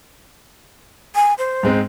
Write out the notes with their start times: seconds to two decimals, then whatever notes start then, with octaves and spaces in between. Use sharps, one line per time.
1.15 G#5
1.38 C5
1.63 G#2 G#3 C4